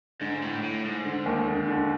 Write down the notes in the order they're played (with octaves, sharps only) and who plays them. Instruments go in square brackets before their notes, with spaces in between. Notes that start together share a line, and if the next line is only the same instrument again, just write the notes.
[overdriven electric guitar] G#2 [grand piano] D3
[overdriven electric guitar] A2
A2
G#2
[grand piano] D3
D#2 D#3
D3
D3